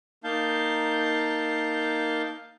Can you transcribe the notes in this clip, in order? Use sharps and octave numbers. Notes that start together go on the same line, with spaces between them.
A#3 D#4 F5 A5 G6